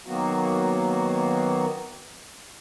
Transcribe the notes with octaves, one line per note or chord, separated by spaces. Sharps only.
D#3 F#3 A#3 B3 F#4